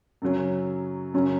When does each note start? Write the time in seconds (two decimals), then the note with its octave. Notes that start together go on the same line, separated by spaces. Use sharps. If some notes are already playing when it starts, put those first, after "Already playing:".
0.22 F#2 C#3 F#3 C#4
1.14 F#2 C#3 F#3 C#4